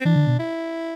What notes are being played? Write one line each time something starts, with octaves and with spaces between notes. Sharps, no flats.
C4
E3 D4
D3
B2
E4